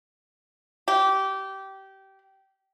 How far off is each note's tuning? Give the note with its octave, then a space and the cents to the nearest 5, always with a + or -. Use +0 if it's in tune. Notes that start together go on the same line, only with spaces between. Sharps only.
G4 -20